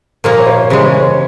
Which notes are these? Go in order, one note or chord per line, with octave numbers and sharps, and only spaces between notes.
A#2 F3 A#3 A#4
C#5
C5
C#3 E3 G#3 C#5
C#5
C#5